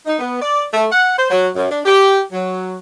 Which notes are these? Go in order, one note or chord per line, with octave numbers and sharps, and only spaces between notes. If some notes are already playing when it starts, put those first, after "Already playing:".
D#4
B3
D5
A3
F#5
C5
F#3
F#2
D4
G4
F#3